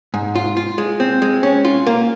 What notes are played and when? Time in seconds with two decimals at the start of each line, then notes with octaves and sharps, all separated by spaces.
0.14 G#2
0.35 F4
0.57 F4
0.78 G#3
1.00 C4
1.22 G#3
1.43 C#4
1.65 F4
1.87 A#3